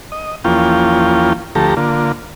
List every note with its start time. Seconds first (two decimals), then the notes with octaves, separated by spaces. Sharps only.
0.12 D#5
0.44 E2 F3 A#3 C#4 F4 G5
1.55 D2 F3 A3 G4 A4 A#5
1.77 D3 A#3 F4